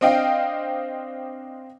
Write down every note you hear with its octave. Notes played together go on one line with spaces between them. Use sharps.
C4 D4 D#5 F5 G5